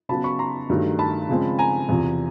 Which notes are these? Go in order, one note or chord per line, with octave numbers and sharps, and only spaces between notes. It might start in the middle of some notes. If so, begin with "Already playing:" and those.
C#3 F#3 B3 A5 B5
B5 C#6
A#5 C6
G2 D#3 F#3 A3
A5 B5
C#3 F3 G#3 C4
G#5 A#5
E2 C3 F3